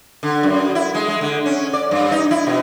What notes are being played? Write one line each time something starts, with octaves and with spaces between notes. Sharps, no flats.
D3
F#2
E4
G#3
G#3
D3
C#4
D5
G2
D#4
E4
B2